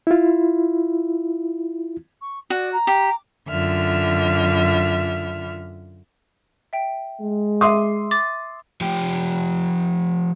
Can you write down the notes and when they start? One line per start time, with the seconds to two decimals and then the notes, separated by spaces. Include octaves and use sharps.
0.07 E4 F4
2.21 C#6
2.50 F#4 D5
2.73 A#5
2.87 G4
3.49 F#2 D3 F4 E5 F6
6.73 E5 G5
7.21 G#3
7.61 E5 C6 D6 D#6
8.11 D6 A6
8.81 F3 G4